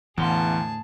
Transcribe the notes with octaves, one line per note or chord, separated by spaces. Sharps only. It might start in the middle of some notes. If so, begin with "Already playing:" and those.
E2 A2 D3 E3 G#4 F#5 A5 C6